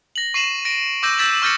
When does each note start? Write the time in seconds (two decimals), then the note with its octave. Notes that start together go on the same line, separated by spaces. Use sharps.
0.16 A#6 F#7
0.34 C#6 C7 D#7 E7 F#7
0.65 A#6 D7
1.03 C#6 D6 E6 G6 A#6
1.18 E6 G6 A6 B6 E7 F#7
1.42 C#6 F6 G6 A6 A#6 C#7